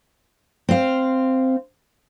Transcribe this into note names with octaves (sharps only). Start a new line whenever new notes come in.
C4 F5